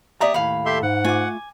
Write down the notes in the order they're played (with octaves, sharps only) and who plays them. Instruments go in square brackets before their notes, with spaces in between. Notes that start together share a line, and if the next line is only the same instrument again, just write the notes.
[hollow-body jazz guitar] A#3 D5 A#5 [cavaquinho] G4 E5 D#6
[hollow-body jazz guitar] D#2 A2 [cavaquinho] F5 B5
[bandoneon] G4 E5 C6 [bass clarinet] A4
[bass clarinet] G#2 [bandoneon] F#5
[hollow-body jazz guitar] A3 F4 [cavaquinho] G#5 D6